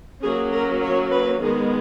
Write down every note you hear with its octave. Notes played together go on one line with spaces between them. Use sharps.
F#3 A#3 C#4 G#4
A#4
C#5
B4
D#3 G#3 B3 G#4